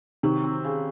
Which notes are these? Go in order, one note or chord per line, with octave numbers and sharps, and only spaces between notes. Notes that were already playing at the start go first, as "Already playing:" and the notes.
C3 D#3 F#3
C4
C#3